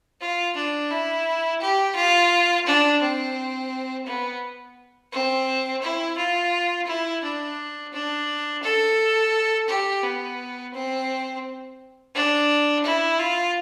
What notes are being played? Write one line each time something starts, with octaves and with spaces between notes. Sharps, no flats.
F4
D4
E4
G4
F4
D4
C4
B3
C4
E4
F4
E4
D4
D4
A4
G4
B3
C4
D4
E4
F4